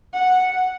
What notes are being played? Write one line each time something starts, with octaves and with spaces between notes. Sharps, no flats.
F#5